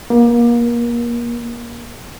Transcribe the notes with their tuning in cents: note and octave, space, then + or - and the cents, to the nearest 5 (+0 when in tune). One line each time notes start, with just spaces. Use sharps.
A#3 +30